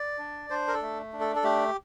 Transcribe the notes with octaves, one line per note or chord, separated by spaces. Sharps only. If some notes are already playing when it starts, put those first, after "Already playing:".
Already playing: D5
D4
D4 C5
A#4
A4
A3
D4
A4
A4
A3 G4